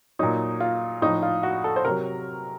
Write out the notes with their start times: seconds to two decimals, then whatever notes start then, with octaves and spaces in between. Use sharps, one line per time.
0.19 A#2 F#3 D#4
0.60 F4
1.02 A2 F3 D#4
1.23 F4
1.43 F#4
1.64 A4
1.76 C5
1.85 C3 F#3 A#4